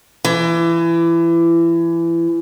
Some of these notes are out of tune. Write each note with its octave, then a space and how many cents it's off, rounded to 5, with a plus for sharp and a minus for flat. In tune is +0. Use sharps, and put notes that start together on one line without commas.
E3 +25